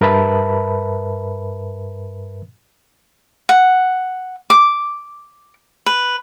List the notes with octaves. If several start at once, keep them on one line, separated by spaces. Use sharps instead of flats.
G2 A#4 B4 E5 A5 B5
F#5
D6
B4